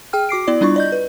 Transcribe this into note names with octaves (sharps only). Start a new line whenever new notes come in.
G#4 G5 F6
F#4 D6 C7 D7
B3 E4 D5
G3 D4 E4 F4 C#6
D5 D#5 G6
B4